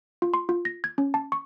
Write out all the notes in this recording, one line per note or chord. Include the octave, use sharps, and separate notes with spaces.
F4
C6
F4
A#6
G#6
C#4
A5
C#6